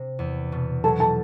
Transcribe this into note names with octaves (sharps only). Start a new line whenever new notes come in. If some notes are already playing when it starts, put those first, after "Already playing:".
Already playing: C3
E2
B2
F#3 A4 A5
A4 A5